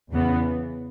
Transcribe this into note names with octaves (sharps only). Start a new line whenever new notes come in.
E2 C#3 E3 B3